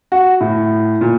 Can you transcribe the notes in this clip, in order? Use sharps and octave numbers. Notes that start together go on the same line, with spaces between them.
F#4
A2
A#2